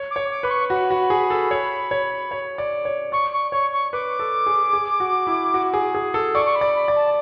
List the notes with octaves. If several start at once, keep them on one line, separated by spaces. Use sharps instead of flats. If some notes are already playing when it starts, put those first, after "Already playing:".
Already playing: C#5
D6
C#5
D6
B4 B5
C#6
F#4 B5
F#4
G#4
A4
C#5
C#5
C#5
D5
C#5
D5 C#6
C#6
C#5 C#6
C#6
B4 D6
A4
G#4
G#4
F#4
E4
F#4
G#4
G#4
A4
D5 C#6
C#6
B5
D5
B5
D5
A5